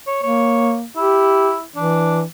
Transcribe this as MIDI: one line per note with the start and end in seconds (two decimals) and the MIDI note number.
0.07 0.21 73
0.23 0.86 58
0.23 0.75 73
0.97 1.64 64
0.97 1.54 67
1.76 2.24 52
1.76 2.20 62